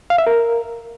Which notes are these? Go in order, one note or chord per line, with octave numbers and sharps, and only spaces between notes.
F5
E5
A#4